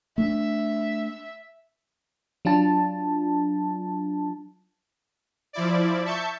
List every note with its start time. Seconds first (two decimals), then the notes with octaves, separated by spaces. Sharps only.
0.18 A3 D4 E5
2.45 F#3 D4 F4 A5
5.53 F3 E4 D5
6.05 E5 A5 C#6 G6